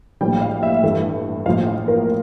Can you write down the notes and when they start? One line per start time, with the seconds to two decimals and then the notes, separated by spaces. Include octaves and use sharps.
0.21 A#1 A2 G3 G5
0.42 F5
0.63 E5
0.83 G2 E3 A3
1.46 A#1 A2 F3 F5
1.67 F5
1.88 A#4